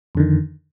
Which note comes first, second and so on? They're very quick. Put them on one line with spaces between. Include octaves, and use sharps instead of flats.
F2 D3 D#3